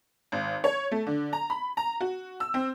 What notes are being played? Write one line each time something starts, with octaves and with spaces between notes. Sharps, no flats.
G#1
C#5
A3
D3
A#5
B5
A#5
F#4
E6
C4